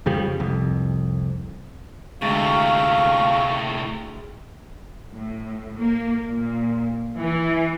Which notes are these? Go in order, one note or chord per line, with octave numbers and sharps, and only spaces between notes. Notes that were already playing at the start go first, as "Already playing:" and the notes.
F2 C#3 F3 G3
C2 F2
D2 A2 C3 G#3 F5 C#6 A6
A2
A#3
A#2
E3